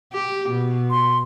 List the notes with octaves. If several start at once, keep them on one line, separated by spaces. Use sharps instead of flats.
G4
B2
C6